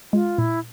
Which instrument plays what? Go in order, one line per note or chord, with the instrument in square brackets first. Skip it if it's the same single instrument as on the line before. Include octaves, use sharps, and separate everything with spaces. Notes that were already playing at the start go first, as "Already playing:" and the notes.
[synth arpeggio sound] G#3 [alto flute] F4
[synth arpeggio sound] A#2 [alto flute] E4